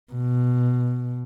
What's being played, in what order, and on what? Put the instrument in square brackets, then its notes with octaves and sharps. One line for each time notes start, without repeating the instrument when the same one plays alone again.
[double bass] B2